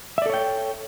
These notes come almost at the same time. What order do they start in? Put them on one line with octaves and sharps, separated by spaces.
E5 D5 A4 C#5 G5